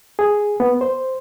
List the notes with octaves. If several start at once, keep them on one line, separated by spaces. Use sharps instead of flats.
G#4
B3
C5